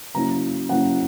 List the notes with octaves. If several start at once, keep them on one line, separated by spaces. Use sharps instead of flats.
C#3 F#3 A#3 C#4 E4 A#5
C#3 F#3 A#3 C#4 E4 F#5